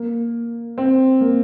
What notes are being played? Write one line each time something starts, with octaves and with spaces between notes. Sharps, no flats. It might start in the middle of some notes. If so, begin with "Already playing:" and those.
Already playing: A#3
C4
A#3